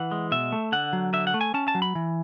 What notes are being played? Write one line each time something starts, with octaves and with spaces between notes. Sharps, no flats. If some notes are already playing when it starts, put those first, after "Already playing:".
Already playing: E3 F#5
G#3
B2 E5
A3
D3 F#5
F#3
D3 E5
F#5
A3
G#5
C#4 A5
A5
F#3
B5
E3